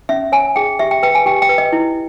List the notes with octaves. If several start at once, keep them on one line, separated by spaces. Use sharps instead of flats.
C#4 E5
C#5 G#5
G#4 G5
G4 E5
G5
B4 G5
G#5
G4 G5
G5
B4
D#5
E4